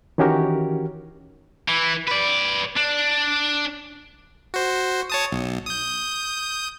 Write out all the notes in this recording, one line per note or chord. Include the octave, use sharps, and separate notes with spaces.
D#3 E3 C#4 F#4 G4 A#4
E3
B4 D5
D4
F#4 C5
C#5 A5 D#6
B1
D#6 G6